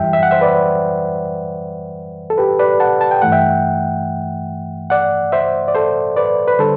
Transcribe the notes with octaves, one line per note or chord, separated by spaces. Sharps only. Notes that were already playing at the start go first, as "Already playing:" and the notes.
Already playing: F#2 E3 G3 E5 G5
E5
F#5
C5 E5
B4 D5
A4
G4 B4
B4 D5
F#5 A5
A5
G5
G2 E3 A3 F#5
E5 G5
D5 F#5
C5 E5
D5
A4 C5
B4 D5
B4
D3 G3 A4 C5